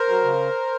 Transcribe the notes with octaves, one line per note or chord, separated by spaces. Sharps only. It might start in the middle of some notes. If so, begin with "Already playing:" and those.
Already playing: A#4 C5
F#3
C#3